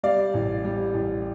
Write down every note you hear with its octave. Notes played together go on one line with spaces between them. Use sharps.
G3 D5 F5
A1
G3
A1